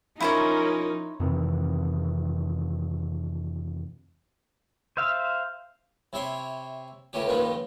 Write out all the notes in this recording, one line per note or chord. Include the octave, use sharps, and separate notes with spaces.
F3 C#4 D#4 E4 A#4 C5 C#5
F2 C3 D#3 E3
C5 E5 F5
C3 E4 C#5 C6
C#2 A2 A3 C#4 G4
C#2 G2 A#2 D#3 F3 B3